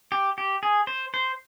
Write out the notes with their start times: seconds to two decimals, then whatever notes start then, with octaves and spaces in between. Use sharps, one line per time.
0.12 G4
0.38 G4
0.63 G#4
0.87 C5
1.14 C5